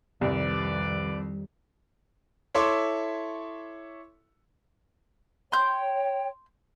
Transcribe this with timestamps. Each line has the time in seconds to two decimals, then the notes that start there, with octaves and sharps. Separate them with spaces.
0.21 C2 F2 D#3 G3 B4 D5
2.55 E4 A4 C#5 E5 C6 D6
5.52 C#5 G5 C6 G6